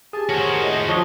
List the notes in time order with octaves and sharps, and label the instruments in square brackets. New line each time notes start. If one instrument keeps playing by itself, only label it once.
[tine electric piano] G4 G#4 [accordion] G#5 A5
[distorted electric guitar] F#4 C5 [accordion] A#4 C#5 G#5
[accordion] A2 D#5
[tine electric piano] F3 C#6 D#6 [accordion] D4 C#5